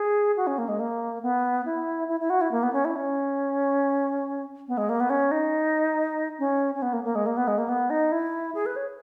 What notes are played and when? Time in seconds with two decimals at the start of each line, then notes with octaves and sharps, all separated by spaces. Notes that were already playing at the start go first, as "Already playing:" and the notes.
Already playing: G#4
0.37 F#4
0.47 C#4
0.58 A#3
0.69 G#3
0.80 A#3
1.23 B3
1.65 E4
2.09 E4
2.20 E4
2.30 F#4
2.41 E4
2.51 A#3
2.63 B3
2.73 C#4
2.85 E4
2.96 C#4
4.68 B3
4.78 G#3
4.89 A#3
5.00 B3
5.10 C#4
5.31 D#4
6.39 C#4
6.75 C#4
6.82 B3
6.93 A#3
7.04 A#3
7.15 G#3
7.26 A#3
7.37 B3
7.48 G#3
7.58 A#3
7.69 B3
7.90 D#4
8.12 E4
8.54 G#4
8.66 B4
8.76 C#5